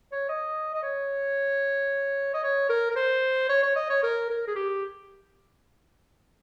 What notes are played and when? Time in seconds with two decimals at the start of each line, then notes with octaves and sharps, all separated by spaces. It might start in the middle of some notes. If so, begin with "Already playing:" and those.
0.12 C#5
0.29 D#5
0.74 D#5
0.83 C#5
2.34 D#5
2.43 C#5
2.69 A#4
2.90 A#4
2.96 C5
3.49 C#5
3.63 C#5
3.76 D#5
3.89 C#5
4.03 A#4
4.30 A#4
4.47 G#4
4.56 G4